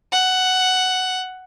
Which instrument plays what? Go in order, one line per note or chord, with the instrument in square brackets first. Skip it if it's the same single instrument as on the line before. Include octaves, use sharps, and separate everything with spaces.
[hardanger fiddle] F#5